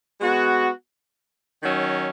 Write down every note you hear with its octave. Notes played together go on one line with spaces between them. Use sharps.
G#3 B3 F#4
D#3 F#3 C#4